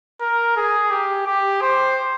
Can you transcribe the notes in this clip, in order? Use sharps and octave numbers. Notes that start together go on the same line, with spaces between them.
A#4
G#4
G4
G4
C5